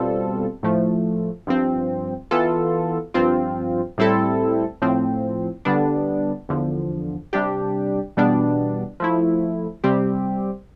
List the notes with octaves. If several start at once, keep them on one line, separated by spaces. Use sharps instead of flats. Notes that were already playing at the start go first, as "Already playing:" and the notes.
Already playing: B2 G3 C4 F4 A4
A2 F3 A3
G2 F3 C4
E3 B3 F4 A4
G2 F3 C4 F4
A2 G3 C4 E4 A4
A2 F3 C4
D3 G3 B3 D4
E2 D3 F3
C3 G3 D4 G4
E2 B2 G3 B3 D4
F3 A3 E4
C3 G3 C4 G4